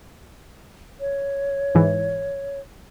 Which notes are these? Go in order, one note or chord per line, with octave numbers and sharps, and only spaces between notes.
C#5
G#2 E3